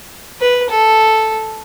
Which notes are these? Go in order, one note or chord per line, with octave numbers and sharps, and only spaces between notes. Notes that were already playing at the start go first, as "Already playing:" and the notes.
B4
A4